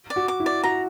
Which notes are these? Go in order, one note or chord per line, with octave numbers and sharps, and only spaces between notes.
D5
F#4
D6
E4
D5
F#4 A#5